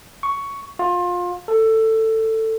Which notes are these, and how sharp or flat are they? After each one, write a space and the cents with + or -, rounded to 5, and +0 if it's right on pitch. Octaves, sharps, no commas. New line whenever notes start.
C#6 +10
F4 +25
A4 +15